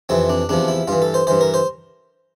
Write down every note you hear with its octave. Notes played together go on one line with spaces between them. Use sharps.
F2 C3 E3 C4
D4
E2 C3 F3 D4
E4
G2 E3 F4
A4
C5
G2 E3 C5
A#4
C5